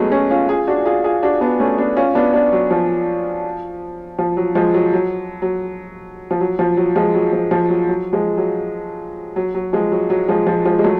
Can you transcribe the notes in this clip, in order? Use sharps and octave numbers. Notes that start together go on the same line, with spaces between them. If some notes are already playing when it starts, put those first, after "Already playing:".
Already playing: F#3 G#3 A3 B3 C#4
A3 C#4
C#4 F4
F4 G#4
D4 F#4
F4 G#4
F4 G#4
D4 F#4
B3 D4
A3 C#4
B3 D4
C#4 F4
B3 D4
B3 D4
F#3
F3
F3
F#3
F3 G#3
F#3
F#3
F#3
F3
F#3
F3
F#3
F3 G#3
F#3
F3
F3
F#3
F#3
F3 G#3
F#3
F#3
F#3
F3 G#3
F#3
F#3
F3 G#3
F3
F3 G#3
G#3
F#3 A3